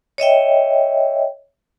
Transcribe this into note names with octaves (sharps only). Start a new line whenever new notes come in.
C#5 D#5 E5 G5